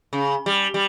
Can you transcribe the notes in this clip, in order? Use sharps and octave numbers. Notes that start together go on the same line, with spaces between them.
C#3
G3
G3